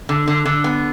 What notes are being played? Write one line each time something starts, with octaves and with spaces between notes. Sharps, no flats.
D3
D3
D3
B3